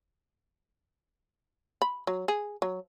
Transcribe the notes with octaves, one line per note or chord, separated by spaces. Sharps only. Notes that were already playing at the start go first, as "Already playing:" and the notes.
B5
F#3
G#4
F#3